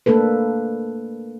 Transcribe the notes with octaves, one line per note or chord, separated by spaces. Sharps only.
A3 A#3 D4 A4 B4